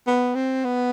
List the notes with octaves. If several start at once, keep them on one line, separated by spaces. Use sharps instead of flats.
B3
C4
B3